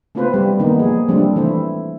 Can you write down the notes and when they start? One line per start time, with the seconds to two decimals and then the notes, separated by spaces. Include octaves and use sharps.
0.15 A3 B3 C4 F4 B4 C5
0.34 G3 G4
0.59 D#3 A#3 B3 D#4
0.79 F3 A#3 G#4
1.08 F3 G3 A3 C4 D4
1.36 E3 A3 E4 C5